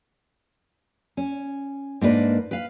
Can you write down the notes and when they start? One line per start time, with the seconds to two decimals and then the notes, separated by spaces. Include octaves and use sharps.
1.17 C#4
2.01 G#2 A#3 D4 B4
2.51 B4 F5